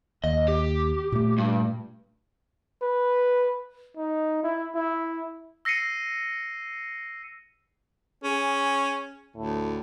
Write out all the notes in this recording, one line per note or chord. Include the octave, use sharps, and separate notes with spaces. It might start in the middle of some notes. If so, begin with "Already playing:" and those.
D#2 D#5
G4
A#2 A3
G2
B4
D#4
E4
E4
E6 A#6 C7 C#7 D#7
C#4 G#4
D2 A2